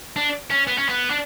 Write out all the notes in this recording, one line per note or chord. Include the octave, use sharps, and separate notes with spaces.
D4
C#4
B3
C#4
B3
D4